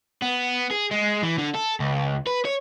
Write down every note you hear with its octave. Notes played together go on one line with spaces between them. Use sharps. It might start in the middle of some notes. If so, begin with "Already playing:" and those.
B3
G#4
G#3
E3
D3
A4
C#2
B4
C#5